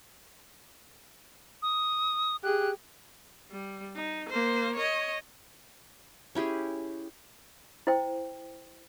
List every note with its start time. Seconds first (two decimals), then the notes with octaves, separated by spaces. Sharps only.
1.62 D#6
2.43 G4 G#4 F#6
3.51 G3
3.96 D#4
4.29 A#3 C5
4.76 C#5 D#5
6.35 C#4 E4 G4 G#4
7.87 E4 C5 G5